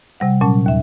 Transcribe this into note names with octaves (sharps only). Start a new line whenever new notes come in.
C3 G3 F#5
A#2 F#3 C#4 A5
D#2 E5